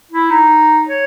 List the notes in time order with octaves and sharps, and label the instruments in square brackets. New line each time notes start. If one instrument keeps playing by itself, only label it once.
[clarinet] E4
D#4
C#5